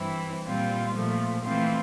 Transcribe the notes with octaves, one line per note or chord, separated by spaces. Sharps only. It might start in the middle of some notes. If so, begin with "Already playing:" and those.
Already playing: G2 E3 G3 C4 E4
A#2 G3 C4 F4
A#2 F3 A3
E3 A3 C4 F4